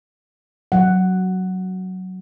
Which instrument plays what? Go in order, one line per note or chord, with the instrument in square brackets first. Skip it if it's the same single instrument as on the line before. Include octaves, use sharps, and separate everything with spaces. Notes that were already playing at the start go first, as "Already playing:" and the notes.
[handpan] F#3 F#5